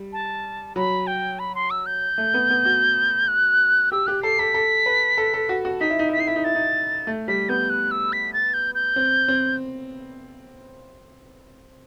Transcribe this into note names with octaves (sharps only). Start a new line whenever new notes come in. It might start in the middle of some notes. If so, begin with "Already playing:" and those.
Already playing: G3
A5
F#3 B5
G5
B5
C6
E6
G6
A3
B3
B3
F#4
F#6
G4 E6
G4 F#6
A4 C7
A4 B6
A4
B4
A4
A4
F#4
F#4
D#4 B6
E4
D#4
E4 B6
D#4 C7
E4 B6
D#4
E4 A6
D#4
A3
G3 B6
B3 G6
F#6
E6
B6
A6
G6
G6
C4
C4